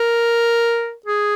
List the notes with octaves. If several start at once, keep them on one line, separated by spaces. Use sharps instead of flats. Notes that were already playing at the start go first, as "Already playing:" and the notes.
Already playing: A#4
G#4